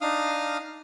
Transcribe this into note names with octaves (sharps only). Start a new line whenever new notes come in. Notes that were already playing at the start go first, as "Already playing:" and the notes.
D4 D#4 F5 D#6 F6